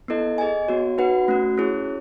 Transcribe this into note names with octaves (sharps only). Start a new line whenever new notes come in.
B3 E4 A4 D#5
G#4 D#5 G#5
B3 F#4 C#5
D#4 F#4 B4 F#5
A3 C#4 F#4
C#4 E4 G#4 C#5